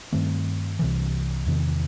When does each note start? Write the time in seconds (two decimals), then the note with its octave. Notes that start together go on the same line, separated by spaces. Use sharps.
0.13 G2 D#3 A3 C4
0.79 C2 C3 E3
1.46 E2 C3 D#3